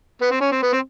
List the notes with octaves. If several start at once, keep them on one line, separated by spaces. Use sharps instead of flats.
B3
C4
C#4
C4
B3
C4